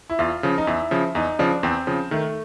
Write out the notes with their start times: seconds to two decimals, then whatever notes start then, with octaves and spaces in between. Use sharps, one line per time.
0.10 E4
0.19 E2 F4
0.43 C#3 F3
0.58 D#4
0.67 E2 E4
0.91 C#3 F3
1.15 E2 D#4
1.39 C#3 F3 D4
1.63 E2 C4
1.87 C#3 F3
2.11 D#3 A3